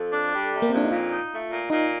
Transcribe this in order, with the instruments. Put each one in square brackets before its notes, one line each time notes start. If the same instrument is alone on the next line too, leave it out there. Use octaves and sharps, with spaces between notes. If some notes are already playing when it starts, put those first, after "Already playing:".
Already playing: [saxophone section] F2 [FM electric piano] A4
[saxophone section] D4
G3
C3
[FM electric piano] A#3
[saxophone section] F2 [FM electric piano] C4
[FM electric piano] D4
D#4
[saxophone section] A#2 [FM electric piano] F4
[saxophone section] D#4
A3
A#2
[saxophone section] A#2 [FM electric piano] D#4